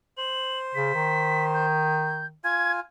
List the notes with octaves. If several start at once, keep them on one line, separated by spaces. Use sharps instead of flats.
C5 F#7
C#3 B6
D#3
G6
F4 G#5 G#6